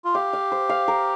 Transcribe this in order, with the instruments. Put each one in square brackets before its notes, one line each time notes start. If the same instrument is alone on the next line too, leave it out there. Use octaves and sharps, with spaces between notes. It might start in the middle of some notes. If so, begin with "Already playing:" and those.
[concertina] F4
[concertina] G4 [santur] F5
[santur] F5
C5
F5
A#4